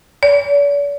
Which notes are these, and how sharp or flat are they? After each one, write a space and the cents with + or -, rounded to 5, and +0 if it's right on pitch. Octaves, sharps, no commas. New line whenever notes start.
D5 -45